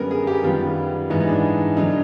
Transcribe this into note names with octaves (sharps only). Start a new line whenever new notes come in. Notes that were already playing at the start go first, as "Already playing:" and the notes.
Already playing: F#2 D3 G3 B3 A#4
G#4
G4
F#2 D#3 G3 B3 F4
G#2 E3 G#3 B3 D#4
D#4
D4
G2 D3 F#3 D#4